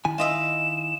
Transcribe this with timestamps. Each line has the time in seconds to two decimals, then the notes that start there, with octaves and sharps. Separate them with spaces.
0.05 D#3 E4 G#5
0.18 F4 D#5 E5 E7